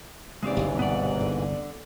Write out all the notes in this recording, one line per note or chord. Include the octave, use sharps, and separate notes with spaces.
D#2 G#2 C#3 E3 G#3 C4 G4 D5
G1 C2
B2 B3 D4 D5 F#5
D3